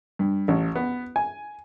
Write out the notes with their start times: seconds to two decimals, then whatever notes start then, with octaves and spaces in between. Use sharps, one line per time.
0.19 G2
0.48 A1
0.75 B3
1.16 G#5